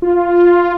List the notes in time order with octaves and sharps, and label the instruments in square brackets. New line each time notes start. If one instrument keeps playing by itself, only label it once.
[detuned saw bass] F4